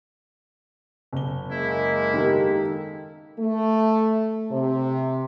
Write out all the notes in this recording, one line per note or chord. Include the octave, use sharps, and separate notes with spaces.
F#1 G7
G#3 A#3 E4
D#3 G4 A4
A3
C3